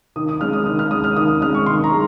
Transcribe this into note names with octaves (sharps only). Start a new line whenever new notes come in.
D#3 D#6
D#6
G#3 C#4 F6
D#6
D#3 F6
F6
G#3 C#4 D#6
F6
D#3 D#6
D#6
G#3 C#4 F6
C#6
D#3 C6
A#5
G#3